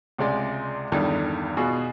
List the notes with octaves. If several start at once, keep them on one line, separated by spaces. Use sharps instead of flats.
C#2 C3 G#3 D5
E2 G2 D3 D#3 G3
B2 F4 F#4 G#4